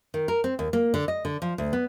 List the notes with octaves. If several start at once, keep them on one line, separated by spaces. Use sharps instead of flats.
D#3
A#4
C4
D#2
A#3
D3
D#5
D3
F3
D2
B3